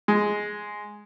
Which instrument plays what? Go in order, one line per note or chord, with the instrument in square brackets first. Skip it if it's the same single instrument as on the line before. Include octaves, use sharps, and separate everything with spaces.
[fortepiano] G#3